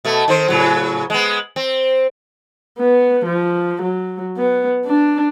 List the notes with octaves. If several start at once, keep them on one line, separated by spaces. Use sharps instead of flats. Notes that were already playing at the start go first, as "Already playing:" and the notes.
B2 A3
D#3 C4 C5
A2 C#3 F#3
G#3 B3
C4
B3
F3
F#3
B3
D4